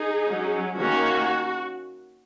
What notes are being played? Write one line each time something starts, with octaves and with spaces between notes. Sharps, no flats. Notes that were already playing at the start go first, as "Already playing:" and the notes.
Already playing: D#4 G#4
F#3 C#4
D#3 A#3 C#4 F#4